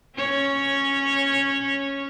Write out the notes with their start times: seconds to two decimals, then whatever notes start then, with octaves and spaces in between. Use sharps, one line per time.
0.16 C#4 C#5